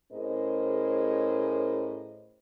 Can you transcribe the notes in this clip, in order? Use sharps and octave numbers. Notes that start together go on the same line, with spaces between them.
A2 C#4 G#4 A#4 C5 D#5